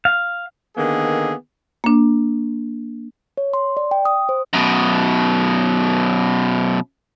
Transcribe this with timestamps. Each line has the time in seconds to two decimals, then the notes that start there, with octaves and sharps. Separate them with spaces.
0.05 F5
0.77 D3 D#3 A#3 B3 G#4
1.84 A#3 D4
3.38 C#5
3.54 C6
3.77 D5
3.91 G5
4.05 D#6
4.29 C5
4.53 F#2 B2